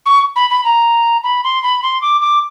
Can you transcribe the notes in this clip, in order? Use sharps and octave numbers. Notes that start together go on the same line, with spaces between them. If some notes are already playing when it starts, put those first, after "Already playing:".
C#6
B5
B5
A#5
B5
C6
B5
C6
D6
D6